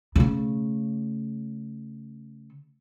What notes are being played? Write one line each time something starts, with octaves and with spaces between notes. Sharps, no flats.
C#3 A3